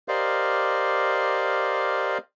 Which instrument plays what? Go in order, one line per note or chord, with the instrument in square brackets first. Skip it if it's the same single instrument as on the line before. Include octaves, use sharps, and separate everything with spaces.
[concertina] G4 A#4 C5 D5 D#5 F5